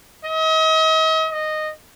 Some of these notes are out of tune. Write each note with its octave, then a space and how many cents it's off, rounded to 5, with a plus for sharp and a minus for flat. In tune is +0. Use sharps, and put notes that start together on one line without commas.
D#5 +40
D#5 -10